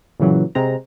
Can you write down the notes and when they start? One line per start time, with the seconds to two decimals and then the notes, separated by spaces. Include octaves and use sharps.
0.20 A#2 C#3 E3 F#3
0.55 C3 G#3 C4 A#5